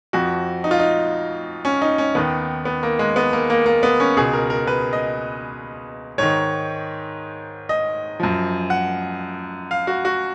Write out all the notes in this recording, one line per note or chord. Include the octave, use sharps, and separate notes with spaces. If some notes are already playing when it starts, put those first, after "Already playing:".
F2 F3 F#4
D#4
F4
D#4
C#4
D#4
C#4
D#2 D#3 B3
B3
A#3
G#3
B3
A#3
A#3
A#3
B3
C#4
C#2 B2 G#4
A#4
A#4
B4
D#5
G#2 D#3 C#5
D#5
F#2 F3
F#5
F5
F#4
F#4